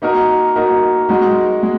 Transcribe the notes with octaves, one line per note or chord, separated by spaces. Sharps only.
A#3 D#4 F#4 A#4
A#3 D#4 F#4 A#4
G#3 D#4 F#4
G#3